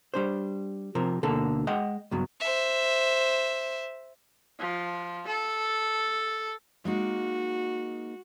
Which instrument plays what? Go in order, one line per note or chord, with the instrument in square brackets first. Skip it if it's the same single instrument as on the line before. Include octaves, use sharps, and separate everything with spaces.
[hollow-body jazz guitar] G3 D4 C5
C3 F3 A#4
D2 B2 D3 A#3 A4
G#3 D#5 F#5 G5
C#2 G2 F#3 B3
[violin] C5 E5
[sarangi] F3
A4
[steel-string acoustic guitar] G#3 A#3 D#4 [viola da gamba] F#4